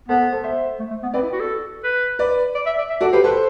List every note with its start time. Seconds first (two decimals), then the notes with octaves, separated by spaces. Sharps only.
0.08 B3 A4 C5
0.32 A4 C5
0.44 C5 E5
0.80 A3
0.91 A3
1.03 B3
1.14 C4 B4 D5
1.22 E4
1.32 F#4
1.40 A4
1.84 B4
2.19 B4 D5
2.55 D5
2.66 E5
2.78 D5
2.90 E5
3.01 F#4 A4 D5
3.12 G4 B4 C5
3.24 A4 B4 C5